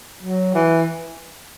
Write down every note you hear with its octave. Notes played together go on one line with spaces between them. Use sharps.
F#3
E3